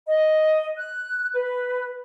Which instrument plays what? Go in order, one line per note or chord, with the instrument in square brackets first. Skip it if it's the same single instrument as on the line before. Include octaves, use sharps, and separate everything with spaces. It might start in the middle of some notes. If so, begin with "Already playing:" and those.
[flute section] D#5
F#6
B4